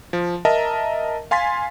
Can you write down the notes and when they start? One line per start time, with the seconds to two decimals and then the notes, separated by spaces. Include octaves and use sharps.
0.13 F3
0.45 A#4 D#5 E5 A5 A#5
1.31 F5 G#5 C6 A6 B6